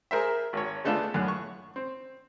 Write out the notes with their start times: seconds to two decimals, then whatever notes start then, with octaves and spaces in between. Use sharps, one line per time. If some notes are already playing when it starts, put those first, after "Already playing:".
0.11 G#4 A#4 C5 E5
0.53 G#1 C#5
0.85 G#3 A3 B3 D4 F4 A4
1.14 F#2 A2 D3 F#6
1.28 C#6
1.76 C4